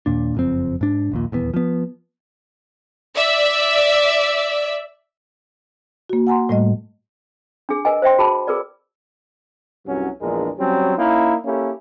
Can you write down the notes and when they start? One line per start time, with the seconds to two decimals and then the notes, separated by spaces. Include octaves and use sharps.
0.06 D#2 A#2 D4
0.35 F#1 F2 C4
0.81 G#2 D4
1.11 A#1 D#2 A#2
1.32 D#1 E2 B3
1.54 F3 B3
3.14 D5 E5
6.10 A#3 F#4
6.27 F#5 G#5 A#5 C6
6.49 A2 G3 A3 D#5
7.69 D4 G#4
7.85 A#4 B4 D#5 G#5
8.02 C5 E5 G5 C6
8.18 F#4 G#4 A5 B5
8.47 G#4 A#4 B4 D5
9.85 C2 G2 F#3 C#4 F#4
10.20 A#1 E2 G#3 D4 A#4
10.58 F#3 G3 C4 C#4
10.96 A#3 C#4 D#4 E4
11.44 A#3 C#4 E4 G4 A4